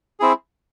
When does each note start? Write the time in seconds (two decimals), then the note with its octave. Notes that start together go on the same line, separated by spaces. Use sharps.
0.20 C4 E4 G#4